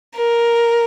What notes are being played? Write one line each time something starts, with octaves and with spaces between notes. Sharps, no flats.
A#4